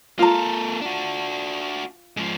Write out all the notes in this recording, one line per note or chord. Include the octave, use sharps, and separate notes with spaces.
A#3 F4 A4 A#5
D4 F#4
G#2 F3